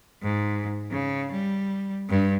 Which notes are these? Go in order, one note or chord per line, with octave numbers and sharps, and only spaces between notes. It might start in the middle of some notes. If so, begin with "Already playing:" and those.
G#2
C#3
G3
G2